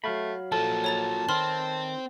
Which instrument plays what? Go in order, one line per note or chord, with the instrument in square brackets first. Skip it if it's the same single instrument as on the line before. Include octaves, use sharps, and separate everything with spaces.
[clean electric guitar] F#3 F5 B5 [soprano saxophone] A3
[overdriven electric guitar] A#2 F3 [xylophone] A4 [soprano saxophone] A5
[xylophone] C#5 A#5 A6
[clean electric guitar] D#3 [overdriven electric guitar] C4 [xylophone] B5 C6 F6